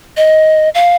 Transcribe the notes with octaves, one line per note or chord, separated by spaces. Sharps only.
D#5
F5